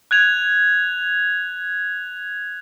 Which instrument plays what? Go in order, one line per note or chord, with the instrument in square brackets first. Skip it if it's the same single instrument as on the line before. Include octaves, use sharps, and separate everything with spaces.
[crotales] F#6 G#6 F7